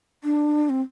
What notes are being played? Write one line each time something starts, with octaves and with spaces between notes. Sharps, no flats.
D4
C4